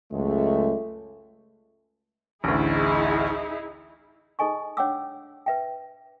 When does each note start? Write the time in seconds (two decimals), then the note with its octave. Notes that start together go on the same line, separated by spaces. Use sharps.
0.11 C#2 F#2 G#3 A3
2.44 A1 D2 D#4 E4 G#4
4.39 D#4 G#4 A4 D#5 G#5 C#6
4.77 D4 C#5 F#5 G5 D6 E6
5.46 B4 E5 G5